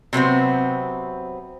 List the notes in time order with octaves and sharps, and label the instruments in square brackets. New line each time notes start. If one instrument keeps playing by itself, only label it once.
[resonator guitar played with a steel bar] C3 F#3 B3 C4